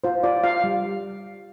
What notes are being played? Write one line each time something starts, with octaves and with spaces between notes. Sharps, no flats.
F4 C5
F4 D5
F4 F5
G3